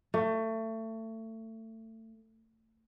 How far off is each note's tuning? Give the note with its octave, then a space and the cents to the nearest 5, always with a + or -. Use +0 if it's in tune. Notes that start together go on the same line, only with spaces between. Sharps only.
A3 +25